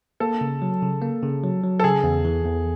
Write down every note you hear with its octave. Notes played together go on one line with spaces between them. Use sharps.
A#3 A4
C#3
F#3
C#3
A#3
C#3
F#3
F#3
A4
C#3 G#4
E2
E3
E2